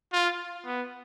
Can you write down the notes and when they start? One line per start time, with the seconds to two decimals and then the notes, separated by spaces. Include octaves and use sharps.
0.13 F4
0.66 B3